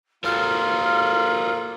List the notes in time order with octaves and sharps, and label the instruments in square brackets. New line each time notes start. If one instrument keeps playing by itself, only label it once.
[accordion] A#3 F4 [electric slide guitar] F#4 A4 A#4 [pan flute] F6